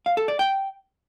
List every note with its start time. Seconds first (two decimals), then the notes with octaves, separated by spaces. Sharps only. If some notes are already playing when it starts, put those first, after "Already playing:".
0.06 F5
0.17 A4
0.28 D5
0.39 G5